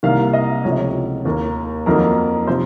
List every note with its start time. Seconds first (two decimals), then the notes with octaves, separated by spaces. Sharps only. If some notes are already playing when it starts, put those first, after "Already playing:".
0.03 C2 C3 D#3 A#3 F5
0.33 D#5
0.64 C#2 C3 F3 A3 C#5
0.72 D#5
0.79 C#5
1.25 D#2 D#3 A#3
1.86 F2 D#3 F#3 A#3 A#4
2.47 C3 F3 C5